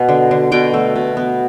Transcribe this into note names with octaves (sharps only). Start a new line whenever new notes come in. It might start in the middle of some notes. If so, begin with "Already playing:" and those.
Already playing: B2 B3
D3
D3
B2 G5
A3
B2
B3